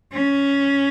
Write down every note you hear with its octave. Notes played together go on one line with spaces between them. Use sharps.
C#4